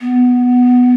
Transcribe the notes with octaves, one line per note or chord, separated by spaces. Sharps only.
B3